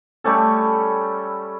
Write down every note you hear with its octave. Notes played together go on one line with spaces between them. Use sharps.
G3 A3 C#4 A4